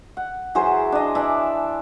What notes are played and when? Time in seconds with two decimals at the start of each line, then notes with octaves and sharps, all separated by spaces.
0.17 F#5
0.55 E3 F#3 G#4 C5
0.92 D4 D#5
1.15 E3 D5 E5 A5